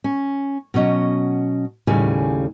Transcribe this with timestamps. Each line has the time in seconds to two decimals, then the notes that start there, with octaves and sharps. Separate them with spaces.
0.04 C#4
0.74 B2 F#3 C#4 D#5
1.87 D#2 A2 C#3 G3 G#5